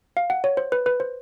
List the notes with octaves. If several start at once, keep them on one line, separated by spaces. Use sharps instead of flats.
F5
F#5
C#5
C5
B4
B4
C5